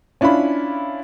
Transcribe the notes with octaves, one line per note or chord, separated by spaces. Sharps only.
C#4 D4 E4 F4 B5